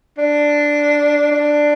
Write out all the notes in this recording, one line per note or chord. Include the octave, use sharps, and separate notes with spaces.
D4
D4